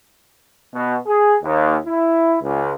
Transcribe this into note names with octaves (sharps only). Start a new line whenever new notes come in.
B2
G#4
D#2
E4
C#2